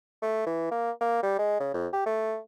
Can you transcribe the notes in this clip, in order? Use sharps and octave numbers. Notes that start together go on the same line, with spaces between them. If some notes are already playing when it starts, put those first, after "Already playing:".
A3
E3
A#3
A#3
G3
G#3
C#3
F2
G4
A3